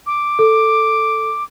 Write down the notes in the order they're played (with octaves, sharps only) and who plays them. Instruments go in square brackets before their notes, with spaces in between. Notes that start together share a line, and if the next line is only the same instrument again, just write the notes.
[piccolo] D6
[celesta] A4